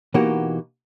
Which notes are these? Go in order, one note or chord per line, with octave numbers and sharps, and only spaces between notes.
B2 E3 A#3 D#4 F#4 G4